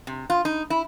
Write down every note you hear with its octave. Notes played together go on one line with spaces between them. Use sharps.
C3
F4
D#4
E4